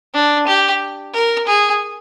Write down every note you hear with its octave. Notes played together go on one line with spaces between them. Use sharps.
D4
G4
A#4
G#4